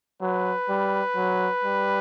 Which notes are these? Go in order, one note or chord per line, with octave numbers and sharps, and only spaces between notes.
F#3 B4
G3
F#3
G3